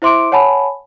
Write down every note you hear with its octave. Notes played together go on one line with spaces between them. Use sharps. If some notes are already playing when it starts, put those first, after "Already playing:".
E4 C5 E5 C6 D6 D7
C#5 F#5 G#5 A5 B5